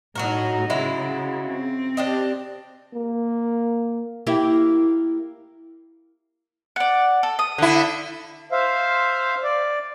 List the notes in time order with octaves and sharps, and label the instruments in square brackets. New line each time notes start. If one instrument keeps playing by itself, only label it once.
[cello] A2 D#4 [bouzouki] F#3 F#4 A#4
[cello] C#3 [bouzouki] F#3 G#3 E4
[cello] C4
[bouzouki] D4 G4 D#5
[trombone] A#3
[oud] A#3 E4 G4
[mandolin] D5 F#5
A4
D#6
[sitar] D3 E4
[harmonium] C5 E5 F5
D5